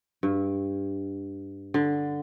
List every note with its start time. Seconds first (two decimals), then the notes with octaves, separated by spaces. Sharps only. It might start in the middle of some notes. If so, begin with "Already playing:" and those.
0.23 G2
1.74 D3